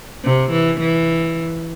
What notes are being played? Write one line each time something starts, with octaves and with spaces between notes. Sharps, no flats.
C3
E3
E3